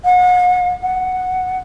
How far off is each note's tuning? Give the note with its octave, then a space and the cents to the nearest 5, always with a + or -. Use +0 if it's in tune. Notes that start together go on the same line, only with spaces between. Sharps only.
F#5 -35
F#5 +0